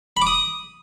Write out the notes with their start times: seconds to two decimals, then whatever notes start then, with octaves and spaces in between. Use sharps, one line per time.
0.17 B5
0.22 D6
0.27 D#6